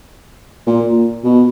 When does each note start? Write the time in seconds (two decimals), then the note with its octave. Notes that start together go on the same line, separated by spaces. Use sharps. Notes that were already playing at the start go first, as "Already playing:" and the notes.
0.67 A#2
1.24 B2